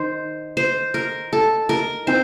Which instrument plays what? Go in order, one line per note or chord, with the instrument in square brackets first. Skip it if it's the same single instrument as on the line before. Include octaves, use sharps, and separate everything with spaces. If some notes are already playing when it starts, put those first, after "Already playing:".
Already playing: [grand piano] D#3 D#4 [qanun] C5
[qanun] C5
A#4
A4
A#4
[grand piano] C4 D#4 [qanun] C5